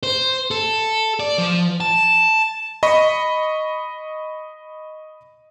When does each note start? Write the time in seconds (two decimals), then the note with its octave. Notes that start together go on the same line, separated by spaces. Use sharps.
0.03 C5
0.51 A4
1.20 D5
1.38 F3
1.80 A5
2.83 D#5 B5 C#6